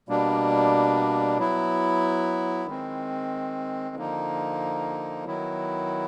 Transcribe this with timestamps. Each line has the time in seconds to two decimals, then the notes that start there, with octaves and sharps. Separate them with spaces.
0.09 B2 G3 A#3 D4
1.37 F#3 B3 E4
2.66 D#3 G#3 C4
3.96 D3 F3 A#3 D#4
5.25 D#3 F#3 B3 E4